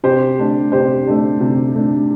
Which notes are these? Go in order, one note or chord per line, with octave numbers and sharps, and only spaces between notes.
C3 G4 C5
A3 D4
C3 G4 C5
A3 D4
C3
A3 D4